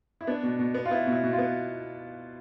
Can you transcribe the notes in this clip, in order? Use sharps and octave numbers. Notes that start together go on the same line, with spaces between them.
E4
B3 D4
B2
B2
B3
F4
B3 E4
B2
E4
B2
F4
B3